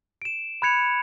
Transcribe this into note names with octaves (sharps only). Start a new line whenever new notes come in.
D7 E7
B5 F#6 G#6 C#7 F7